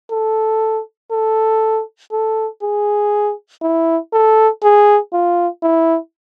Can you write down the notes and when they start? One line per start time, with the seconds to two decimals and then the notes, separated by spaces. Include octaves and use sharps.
0.11 A4
1.11 A4
2.12 A4
2.62 G#4
3.62 E4
4.13 A4
4.63 G#4
5.13 F4
5.63 E4